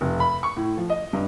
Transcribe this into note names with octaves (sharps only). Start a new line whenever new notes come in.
F1
B5
C#6
A2
F3
D#5
G2